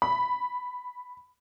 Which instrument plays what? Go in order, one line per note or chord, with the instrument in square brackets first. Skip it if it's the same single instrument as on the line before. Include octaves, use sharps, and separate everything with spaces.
[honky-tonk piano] B5